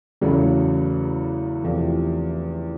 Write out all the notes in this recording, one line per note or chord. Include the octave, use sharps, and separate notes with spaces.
E2 C#3 F#3 A3
E2 C3 F3 A3